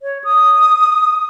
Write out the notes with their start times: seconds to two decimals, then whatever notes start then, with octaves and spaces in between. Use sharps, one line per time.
0.02 C#5
0.24 D#6